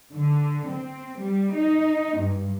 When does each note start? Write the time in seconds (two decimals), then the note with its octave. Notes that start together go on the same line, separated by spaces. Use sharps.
0.15 D3
0.71 C4
1.23 G3
1.57 D#4
2.20 G2